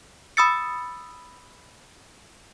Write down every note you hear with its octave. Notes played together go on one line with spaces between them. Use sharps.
B5 D#6 E6 A6 C#7